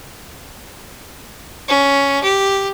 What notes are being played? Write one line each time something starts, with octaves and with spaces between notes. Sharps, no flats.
C#4
G4